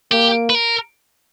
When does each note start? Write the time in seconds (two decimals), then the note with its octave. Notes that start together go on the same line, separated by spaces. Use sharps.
0.12 A#3 G4
0.50 B4
0.55 A#4